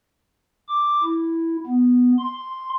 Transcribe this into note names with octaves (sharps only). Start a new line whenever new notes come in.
D6
E4
B3
C6